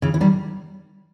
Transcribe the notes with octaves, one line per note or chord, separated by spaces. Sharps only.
C#3 E3
E3
D#3 G3